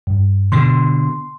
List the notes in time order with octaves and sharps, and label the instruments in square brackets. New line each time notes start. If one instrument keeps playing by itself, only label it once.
[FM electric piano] G2
[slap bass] B2 D3 [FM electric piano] C6